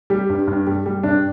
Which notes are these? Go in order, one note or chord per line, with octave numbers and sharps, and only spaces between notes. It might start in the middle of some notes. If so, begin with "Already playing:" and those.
G3 G4
G2
G2
G3
G3
G2 D4